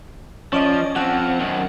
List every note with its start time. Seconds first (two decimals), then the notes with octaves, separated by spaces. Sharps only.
0.53 F3 C#4 D5 D#5
0.96 F3 C4 F#5
1.40 F#2 D#3